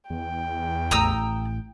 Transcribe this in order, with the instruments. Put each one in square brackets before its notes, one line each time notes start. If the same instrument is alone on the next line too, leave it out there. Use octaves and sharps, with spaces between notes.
[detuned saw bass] E2 [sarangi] G5
[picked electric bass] A1 A2 [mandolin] A#5 D#6 E6